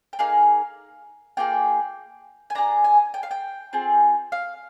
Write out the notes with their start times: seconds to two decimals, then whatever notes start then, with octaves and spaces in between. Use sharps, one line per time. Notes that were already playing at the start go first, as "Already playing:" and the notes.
0.13 G5
0.19 A#3 D#4 G#4 F5
1.37 A#3 F4 G#4 G5
2.50 G#5
2.55 D4 G#4 A#5
2.84 G#5
3.14 G5
3.23 F5
3.31 G5
3.73 C4 F4 G#4
4.32 F5